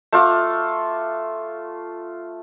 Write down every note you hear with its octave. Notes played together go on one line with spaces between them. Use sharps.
A3 F4 D6